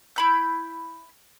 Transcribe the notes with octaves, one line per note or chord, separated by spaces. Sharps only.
E4 B5 G6